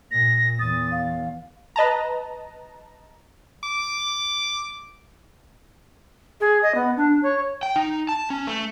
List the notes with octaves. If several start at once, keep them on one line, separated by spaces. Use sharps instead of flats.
A#2 A#6
E2 D#6 A6
F5
B4 D#5 A5 A#5
D6
G#4
D#5
B3
D4
C#5
G5
D#4
A5
C#4
A3